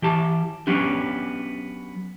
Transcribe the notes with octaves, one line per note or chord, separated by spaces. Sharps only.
E3 G4 A5
F#3 B3 C#4 D4 G4